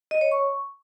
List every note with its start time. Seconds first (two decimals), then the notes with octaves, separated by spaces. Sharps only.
0.11 D#5
0.21 C#5
0.31 C#6